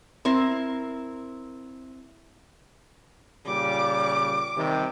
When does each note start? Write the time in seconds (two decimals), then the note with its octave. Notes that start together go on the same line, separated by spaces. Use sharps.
0.25 C4 E4 A#4
3.46 A#2 C#3 G3 D6
4.57 C3 D#3 G3